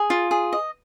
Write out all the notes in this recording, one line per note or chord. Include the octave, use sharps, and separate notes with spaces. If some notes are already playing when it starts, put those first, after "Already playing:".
Already playing: G#4
F4
G#4
D#5